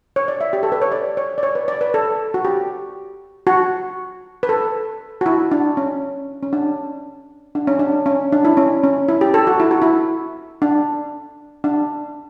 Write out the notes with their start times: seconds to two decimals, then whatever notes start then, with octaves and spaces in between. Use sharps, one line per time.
0.16 C#5
0.28 D5
0.41 E5
0.53 G4
0.63 A4
0.72 B4
0.82 C#5
0.92 D5
1.17 C#5
1.38 D5
1.43 C#5
1.55 B4
1.68 D5
1.81 B4
1.94 A4
2.34 F#4
2.45 G4
3.47 F#4
4.43 B4
4.49 A4
5.21 F#4
5.26 E4
5.51 D4
5.77 C#4
6.43 C#4
6.53 D4
7.55 D4
7.67 C#4
7.79 D4
8.06 C#4
8.32 D4
8.45 E4
8.57 C#4
8.84 C#4
9.08 E4
9.21 G4
9.34 A4
9.47 F#4
9.60 E4
9.71 F#4
9.82 E4
10.62 D4
11.64 D4